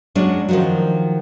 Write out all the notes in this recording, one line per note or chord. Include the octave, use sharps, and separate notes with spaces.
F#3 G#3 C#4 D4
D#3 F3 F#3